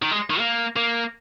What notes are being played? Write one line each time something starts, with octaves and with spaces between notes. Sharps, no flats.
D#3
G#3
D#3
A#3
A#3